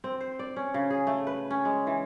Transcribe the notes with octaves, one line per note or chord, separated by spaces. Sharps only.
C4
C5
D5
C#4
C#3
G#4
A3
B4
C#4
G#3
E3